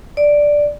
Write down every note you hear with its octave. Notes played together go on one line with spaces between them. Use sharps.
D5